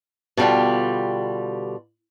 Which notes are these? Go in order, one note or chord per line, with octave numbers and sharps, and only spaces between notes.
B2 D3 G3 F4 G4